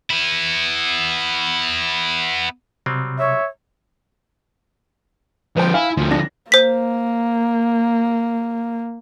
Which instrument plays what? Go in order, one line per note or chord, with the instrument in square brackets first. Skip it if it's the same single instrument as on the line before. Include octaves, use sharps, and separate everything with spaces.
[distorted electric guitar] B3 E4
[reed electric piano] C3 [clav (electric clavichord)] F#3 G3 C4
[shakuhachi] C#5 [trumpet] E5
[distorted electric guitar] D3 F3 [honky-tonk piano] B4 C5 G5
[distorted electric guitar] E4 [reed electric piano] F5 [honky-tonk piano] G#5
[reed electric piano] D2 [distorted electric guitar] D3 F3
[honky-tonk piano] D4 A#6
[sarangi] A#3 [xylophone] C5 B6